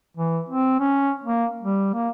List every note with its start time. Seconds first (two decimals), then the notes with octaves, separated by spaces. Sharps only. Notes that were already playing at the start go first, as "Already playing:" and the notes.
0.17 E3
0.49 C4
0.80 C#4
1.24 A#3
1.61 G3
1.94 A#3